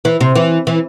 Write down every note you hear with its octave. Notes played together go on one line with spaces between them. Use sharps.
E3
C3
E3
E3